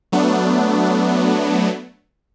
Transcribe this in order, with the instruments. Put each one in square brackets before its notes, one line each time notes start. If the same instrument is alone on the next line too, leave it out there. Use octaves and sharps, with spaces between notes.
[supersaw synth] F#3 A3 B3 D4